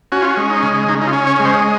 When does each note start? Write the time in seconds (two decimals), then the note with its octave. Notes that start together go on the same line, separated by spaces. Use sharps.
0.12 C#4 F#4
0.22 F4
0.31 F#4
0.37 G#3
0.50 D#4
0.63 C#3
0.88 C#3 D#4
1.02 D#4
1.07 F4
1.13 C#4
1.27 C#5
1.40 G#3
1.45 C5